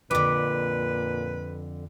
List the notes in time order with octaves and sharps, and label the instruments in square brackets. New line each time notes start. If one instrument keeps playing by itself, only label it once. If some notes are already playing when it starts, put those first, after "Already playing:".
[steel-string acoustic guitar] F2 D3 [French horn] A#2 [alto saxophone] B4 [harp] D6 B6